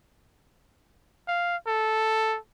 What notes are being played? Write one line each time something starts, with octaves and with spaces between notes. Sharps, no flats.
F5
A4